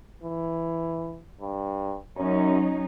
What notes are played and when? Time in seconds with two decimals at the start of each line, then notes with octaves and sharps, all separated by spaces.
0.23 E3
1.41 G2
2.17 F#2 F#3 C#4 D#4